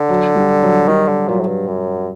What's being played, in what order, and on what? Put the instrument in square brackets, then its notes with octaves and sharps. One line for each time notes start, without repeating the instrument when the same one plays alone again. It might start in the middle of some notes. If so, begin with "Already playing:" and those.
Already playing: [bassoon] D3
[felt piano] F#3
G3
F#3
[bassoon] D#3 [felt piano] G3
[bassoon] D3
[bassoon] A#2 [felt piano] F#3
[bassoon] A2
G2
F#2